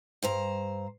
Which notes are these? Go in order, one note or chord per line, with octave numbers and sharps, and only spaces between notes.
G2 C5 A#5